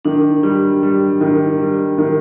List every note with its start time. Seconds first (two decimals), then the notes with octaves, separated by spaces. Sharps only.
0.05 D#3 D4
0.43 G3
0.83 G3
1.21 D#3
1.60 G3
1.98 D#3